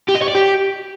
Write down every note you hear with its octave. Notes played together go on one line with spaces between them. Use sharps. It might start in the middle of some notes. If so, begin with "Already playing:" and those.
G4
D#5
C#5
D5
G4